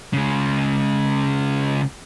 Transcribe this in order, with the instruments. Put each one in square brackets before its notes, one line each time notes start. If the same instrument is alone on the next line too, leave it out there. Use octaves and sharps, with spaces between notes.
[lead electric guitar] C#3 G#3